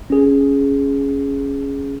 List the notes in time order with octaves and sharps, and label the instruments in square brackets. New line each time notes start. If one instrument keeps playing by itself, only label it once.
[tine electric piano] C#4 G#4